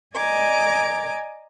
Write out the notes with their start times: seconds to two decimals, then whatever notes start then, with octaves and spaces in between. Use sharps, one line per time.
0.15 D5 D#5 G#5 A#5 D6 G#6